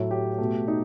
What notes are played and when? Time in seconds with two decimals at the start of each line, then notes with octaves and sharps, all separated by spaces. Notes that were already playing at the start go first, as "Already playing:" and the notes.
Already playing: A2 F#3 A3 E4
0.11 G4
0.38 B2 A3
0.68 D#4